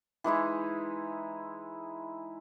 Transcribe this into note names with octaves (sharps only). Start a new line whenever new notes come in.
E3 G#3 D#4 E4